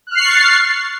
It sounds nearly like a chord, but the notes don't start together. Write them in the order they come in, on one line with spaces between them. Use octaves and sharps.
F#6 F6 C7 C#6 A6